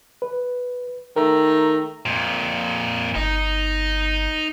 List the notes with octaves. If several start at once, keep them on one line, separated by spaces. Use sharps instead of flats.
B4
D#3 A3 A#4 A#5
F2 A#2
G1 D#4